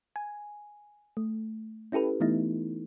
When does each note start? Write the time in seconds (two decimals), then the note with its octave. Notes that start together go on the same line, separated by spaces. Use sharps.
0.16 G#5
1.17 A3
1.92 C#4 E4 G4 A4 B4
2.20 E3 A3 B3 D#4 E4